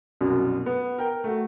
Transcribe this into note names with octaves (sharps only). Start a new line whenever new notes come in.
C2 F#2 B2
B3
A#4 G5
A3 F#4